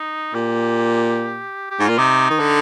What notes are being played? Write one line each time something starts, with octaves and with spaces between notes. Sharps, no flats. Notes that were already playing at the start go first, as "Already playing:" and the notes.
Already playing: D#4
A#2 G4
G4
G#2
A#2 F4
C3 D#4
D#3
D3